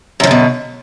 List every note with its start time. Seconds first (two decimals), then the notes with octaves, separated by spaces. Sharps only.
0.20 F#2
0.24 F3
0.27 D3
0.31 B2